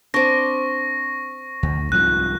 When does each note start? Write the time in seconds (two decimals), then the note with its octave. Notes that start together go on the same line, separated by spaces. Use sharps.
0.14 C4 D4 C#6 A#6
1.63 D2
1.92 C2 G#2 F3 F#6